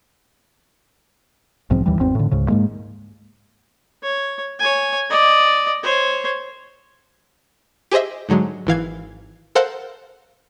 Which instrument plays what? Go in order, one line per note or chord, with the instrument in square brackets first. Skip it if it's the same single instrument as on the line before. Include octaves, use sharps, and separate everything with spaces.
[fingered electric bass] B1 G#2 F3 C4
D#2 E3 G3
G#1 E2 C4
A2 D3
C#2 G#2 C#3
G#2 G#3 A#3
[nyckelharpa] C#5
C#5 G#5
D5 D#5
C5 C#5
[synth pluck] G4 G#4 C5 D#5 E5
G#2 D3 F#3 G#3
G#1 E3 F5 G#6
A4 A#4 C5 F5 F#5